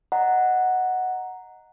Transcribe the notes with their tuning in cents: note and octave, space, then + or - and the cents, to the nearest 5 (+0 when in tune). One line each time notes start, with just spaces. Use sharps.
D#5 +0 F#5 +0 A#5 +0